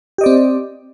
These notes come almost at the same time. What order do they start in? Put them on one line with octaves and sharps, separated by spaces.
G4 D#5 D5 C4